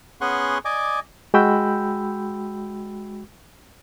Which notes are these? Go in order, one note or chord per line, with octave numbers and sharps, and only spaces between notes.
B3 C#4 G#4 F#5 C6 C#6
D5 D#5 G#5 D6
G#3 F#4 G5 B5 E6 G6